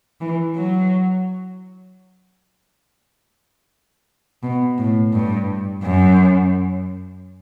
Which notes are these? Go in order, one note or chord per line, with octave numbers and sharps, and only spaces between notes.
E3
F#3
B2
A2
G2
F#2